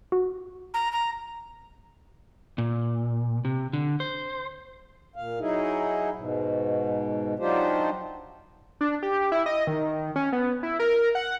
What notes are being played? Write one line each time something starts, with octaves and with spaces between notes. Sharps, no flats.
F#4
A#5
A#5
A#2
C3
D3
C5
A#2 F5
F#3 D#4 E4 G#4
G#2 B2
F#3 D4 D#4 F4 G4 C5
D4
G4
E4
D#5
D#3
C#4
B3
E4
A#4
F#5